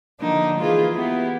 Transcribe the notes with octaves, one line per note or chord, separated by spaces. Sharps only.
D3 F3 A#3 D4 D#4
E3 A#3 E4 F4 G#4 B4
B3 E4 G4